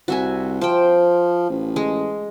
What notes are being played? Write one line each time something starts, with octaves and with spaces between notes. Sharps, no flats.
C2 F#4 E5 G#5
F3 C5 G5
A1
G#3